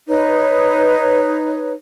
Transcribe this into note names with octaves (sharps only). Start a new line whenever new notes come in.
D#4 B4 C#5